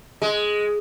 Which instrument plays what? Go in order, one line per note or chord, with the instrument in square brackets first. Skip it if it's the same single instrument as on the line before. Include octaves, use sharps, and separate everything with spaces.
[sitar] G#3